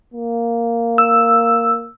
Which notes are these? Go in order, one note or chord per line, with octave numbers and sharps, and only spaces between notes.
A#3
E6